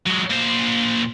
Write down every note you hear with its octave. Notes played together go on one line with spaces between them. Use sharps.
F#3 G#3
A#2 C5